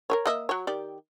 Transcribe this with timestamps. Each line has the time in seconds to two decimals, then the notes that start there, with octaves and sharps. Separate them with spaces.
0.10 A#4 B4 C#5
0.26 A#3 D#5 E5
0.49 F#3 C#5
0.67 D#3 G4 D5